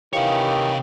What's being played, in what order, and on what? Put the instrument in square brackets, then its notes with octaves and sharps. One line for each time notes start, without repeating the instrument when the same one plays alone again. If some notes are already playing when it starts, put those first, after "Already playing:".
[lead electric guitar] C3 C#5 [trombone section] D#3 E3 [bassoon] G4 [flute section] F5